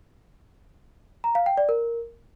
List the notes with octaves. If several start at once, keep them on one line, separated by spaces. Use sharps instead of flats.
A#5
F5
G5
D5
A#4